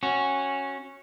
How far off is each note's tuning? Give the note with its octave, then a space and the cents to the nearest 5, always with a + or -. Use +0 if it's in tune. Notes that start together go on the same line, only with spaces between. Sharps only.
C#4 -10 F#4 +0